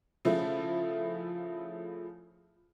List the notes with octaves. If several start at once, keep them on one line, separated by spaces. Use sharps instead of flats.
C#3 F3 A3 E4